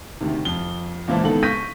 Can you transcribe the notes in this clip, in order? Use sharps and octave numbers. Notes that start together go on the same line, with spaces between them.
D2 C3 D#3
F2 G7
C#2 A#2 E3 E4 C5 A5
C#2 D#3 B3 A4 F#7
C#6 G6 A#6 B6 D#7